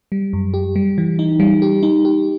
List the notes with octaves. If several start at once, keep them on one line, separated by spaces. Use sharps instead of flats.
G3
F#2
G4
G3
E3
D#4
G3
G4
D#4
G4